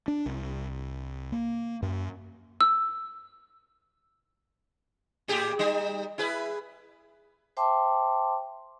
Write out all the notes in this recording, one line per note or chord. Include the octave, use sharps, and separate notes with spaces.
D4
C2
A#3
F#2
E6
A2 G4 G#4
G3 D#4
E4 G#4 B4
C5 E5 G5 A5 C6 D6